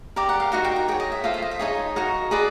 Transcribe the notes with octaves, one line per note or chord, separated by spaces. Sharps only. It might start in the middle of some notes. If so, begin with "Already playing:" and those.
G4 A#4 D5 A#5
F#5
F5
D#4 F#4 A#4 F#5
G5
G5
G#4 C#5 G5
D#5
E5
F4 A4 C5 F5
E5
D#5
E5
D#4 G#4 C#5 D#5
D#4 F#4 A#4
G#4 B4 D5 D#5